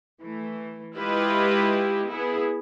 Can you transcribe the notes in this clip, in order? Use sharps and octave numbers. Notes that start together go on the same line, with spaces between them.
E3 A3
G#3 E4 F4 G4 B4 D#5
B3 E4 G#4